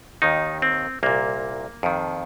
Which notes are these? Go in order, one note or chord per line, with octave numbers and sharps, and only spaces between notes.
D#2 D#3 D#4
C4
C2 A#2 A#3
F2 D#3